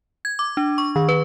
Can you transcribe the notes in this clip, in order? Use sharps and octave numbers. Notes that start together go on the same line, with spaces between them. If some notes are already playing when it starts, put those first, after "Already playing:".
G#6
D6
D4
C#6
D#3
B4